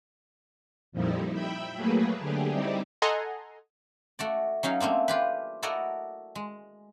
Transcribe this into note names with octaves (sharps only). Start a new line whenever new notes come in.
F2 A#2 F3 G3 D#4 E4
E5 G5 B5
F#3 A3 A#3 G#4 B4
D3 G4 G#4
G3 C4 D#4 E4 G4
A4 D#5 F#5 G#5 A#5 C6
A3 F#4 D5
F#3 C#4 D#4 F5
A3 A#3 C4 D4
F4 G4 B4
E4 F#4 A4 A#4 D5 D#5
G#3